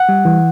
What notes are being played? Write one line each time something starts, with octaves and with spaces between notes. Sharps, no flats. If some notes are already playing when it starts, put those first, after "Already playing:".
Already playing: F#5
G3
E3